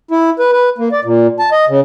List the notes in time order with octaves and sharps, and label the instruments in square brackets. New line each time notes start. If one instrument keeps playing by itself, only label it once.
[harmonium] E4
B4
B4
A#3
D5
A#2
A5
D#5
C#3